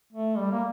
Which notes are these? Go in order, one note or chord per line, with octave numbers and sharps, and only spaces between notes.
A3
G3
A#3